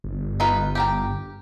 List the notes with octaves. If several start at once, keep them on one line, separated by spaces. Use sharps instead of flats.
G1
D#4 F4 B4
G4 A#4 G5